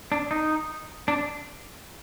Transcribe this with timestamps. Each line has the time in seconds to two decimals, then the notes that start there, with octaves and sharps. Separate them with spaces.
0.12 D4
0.31 D#4
1.08 D4